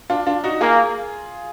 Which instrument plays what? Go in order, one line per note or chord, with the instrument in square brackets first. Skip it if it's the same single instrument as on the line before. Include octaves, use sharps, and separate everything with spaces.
[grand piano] D4 F4
D4 F4
D#4 F#4
[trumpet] A#3 [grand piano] F4 G#4